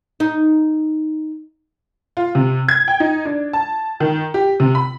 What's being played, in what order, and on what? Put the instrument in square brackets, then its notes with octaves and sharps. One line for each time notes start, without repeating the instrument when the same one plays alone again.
[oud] D#4
[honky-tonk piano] F4
C3
G#6
G5
D#4
D4
A5
D#3
G4
C3
B5